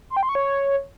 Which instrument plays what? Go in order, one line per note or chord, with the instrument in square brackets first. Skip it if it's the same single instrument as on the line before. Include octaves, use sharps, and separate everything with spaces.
[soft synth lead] C6
G5
C6
C#6
C#5